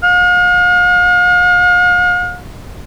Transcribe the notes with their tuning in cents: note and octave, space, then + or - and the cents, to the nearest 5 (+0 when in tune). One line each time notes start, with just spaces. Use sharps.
F5 +45